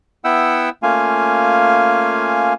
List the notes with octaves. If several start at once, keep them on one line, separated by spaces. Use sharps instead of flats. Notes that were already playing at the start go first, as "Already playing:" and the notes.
B3 E4 E5 F#5 G5 E6
A3 A#3 C#4 F4 F5 G#5